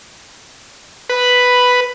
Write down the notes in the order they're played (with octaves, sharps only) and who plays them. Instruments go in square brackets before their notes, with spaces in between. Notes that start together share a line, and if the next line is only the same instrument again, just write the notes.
[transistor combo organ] B4 [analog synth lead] B5